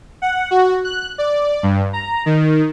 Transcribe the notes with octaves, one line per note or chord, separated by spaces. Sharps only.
F#5
F#4
F#6
D5
G2
A#5
D#3